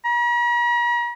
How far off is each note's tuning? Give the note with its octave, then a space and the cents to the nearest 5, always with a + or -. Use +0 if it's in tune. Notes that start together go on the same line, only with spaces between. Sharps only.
A#5 +45